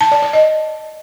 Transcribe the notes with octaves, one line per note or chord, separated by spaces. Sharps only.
A5
D5
D5
D#5